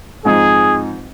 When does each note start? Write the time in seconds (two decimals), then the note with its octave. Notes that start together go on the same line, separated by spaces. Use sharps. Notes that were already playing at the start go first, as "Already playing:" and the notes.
0.25 G#2 F3 C4 D#4 G#4